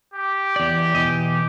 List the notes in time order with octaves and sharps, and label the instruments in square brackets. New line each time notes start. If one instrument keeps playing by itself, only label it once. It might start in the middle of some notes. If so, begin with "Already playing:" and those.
[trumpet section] G4
[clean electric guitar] E2 D5
B2 E3 D#5